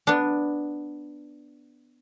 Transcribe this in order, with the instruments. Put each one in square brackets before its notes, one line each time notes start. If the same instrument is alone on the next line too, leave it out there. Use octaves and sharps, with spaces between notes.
[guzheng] B3 D4